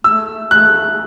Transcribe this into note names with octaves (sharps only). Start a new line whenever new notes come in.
A3 E6
A3 F#6